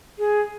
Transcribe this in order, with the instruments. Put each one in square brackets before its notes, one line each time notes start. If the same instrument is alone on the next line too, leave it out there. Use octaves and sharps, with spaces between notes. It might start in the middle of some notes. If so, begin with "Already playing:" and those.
[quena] G#4